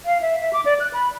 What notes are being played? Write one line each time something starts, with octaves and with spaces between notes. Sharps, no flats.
F5
E5
E5
D6
D5
F#6
B5